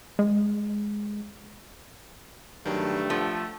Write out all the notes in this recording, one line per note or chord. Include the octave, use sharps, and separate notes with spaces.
G#3
G2 D#3 F#3 A3
F3 A4 F#5